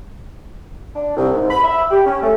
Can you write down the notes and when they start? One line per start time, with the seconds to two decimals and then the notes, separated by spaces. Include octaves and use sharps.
0.95 D4
1.16 C2
1.32 G#2
1.49 B5
1.64 E5
1.91 G4
2.06 C#4
2.22 A3